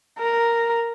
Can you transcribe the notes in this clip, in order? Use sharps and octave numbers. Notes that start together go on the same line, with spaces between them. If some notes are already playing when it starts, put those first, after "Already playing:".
A#4